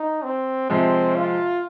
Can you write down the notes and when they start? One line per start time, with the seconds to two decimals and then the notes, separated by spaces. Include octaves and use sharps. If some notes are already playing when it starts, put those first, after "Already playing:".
Already playing: D#4
0.23 C4
0.70 C3 F3 G#3 C4
1.15 F4